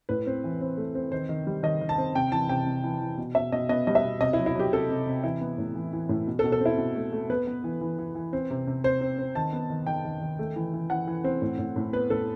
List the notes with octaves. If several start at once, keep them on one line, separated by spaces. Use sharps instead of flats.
A2 B4
C4
E3
C4
A3
C4
D#3 C5
D#3
G3
D#3 D#5
D#3
A5
C4
C3 G5
E3 A5
C3 G5
C3
E3
E3
B2
B2 E5
B2 D#5
B3 D#5
G3 D#5
E5
B2
C3 D#5
E4
F#3
E4
F#3 G4
C3 A4
C3
C3
E3 E4
B3
A2
E3
E3
A2
B2
A4
B2
A4
C4
E4
B2
A3
A3
B3 B4
B3
E3
E3
E3
E3
C4
C3
C3
C4 C5
C4
C4
D#3 A5
B3
D#3
D#3 G5
D#3
D#3
A3
E3
E3
E3 F#5
E3
C4
A2
A2
A2
B3 B4
A2 A4